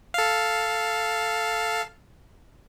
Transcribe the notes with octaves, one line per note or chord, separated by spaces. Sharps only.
A4 F5